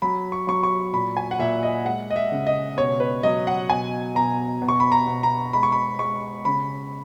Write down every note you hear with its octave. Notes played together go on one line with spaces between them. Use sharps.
F#3 B5
C#6
F#3 C#6
C#6
A#2 B5
G#5
F#5
A#2 E5
D#5
G#3 F#5
D#5
E5
C#3
D#5
B2 C#5
B4
F#3 D#5
F#5
B2 G#5
B2 A#5
B2
C#6
B5
A#5
B2
A#5
G#3 B5
C#6
B5
G#3 C#6
C#3 B5